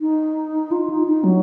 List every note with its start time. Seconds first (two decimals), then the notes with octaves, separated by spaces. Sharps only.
0.01 D#4
0.71 F4
0.90 D#4
1.07 D#4
1.24 F#3